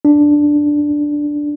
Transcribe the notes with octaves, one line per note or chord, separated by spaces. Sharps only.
D4